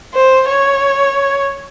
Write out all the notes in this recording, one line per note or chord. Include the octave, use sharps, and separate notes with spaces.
C5
C#5